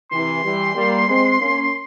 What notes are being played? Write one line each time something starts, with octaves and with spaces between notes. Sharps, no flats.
C3 E3 C6
E3 G3
G3 A#3
G#3 C4
A#3 C#4